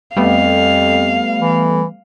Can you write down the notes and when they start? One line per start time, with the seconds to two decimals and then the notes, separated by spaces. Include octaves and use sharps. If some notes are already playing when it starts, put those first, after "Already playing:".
0.16 F2 G3 A3 B3 F5
1.39 E3